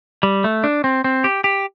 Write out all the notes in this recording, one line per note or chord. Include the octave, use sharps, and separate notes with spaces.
G3
A3
D4
C4
C4
G4
G4